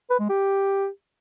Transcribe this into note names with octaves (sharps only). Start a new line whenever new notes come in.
B4
G#3
G4